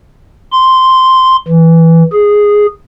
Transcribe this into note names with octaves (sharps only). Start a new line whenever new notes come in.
C6
E3
G#4